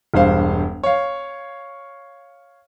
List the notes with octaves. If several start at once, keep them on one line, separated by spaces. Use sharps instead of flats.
E1 G2 C5 F5
C#5 F5